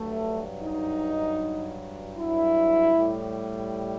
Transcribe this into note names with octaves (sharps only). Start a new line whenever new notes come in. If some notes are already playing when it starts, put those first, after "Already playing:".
Already playing: G2 F#3 A3
D#4
E4
A2 G3